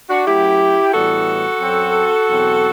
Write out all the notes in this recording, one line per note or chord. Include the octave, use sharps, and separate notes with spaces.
D4 F#4
F#2 F#3 A3 E4 G4
A2 E3 G3 B3 F#4 A4
F#2 F#3 C4
E2 B2 F#3 C4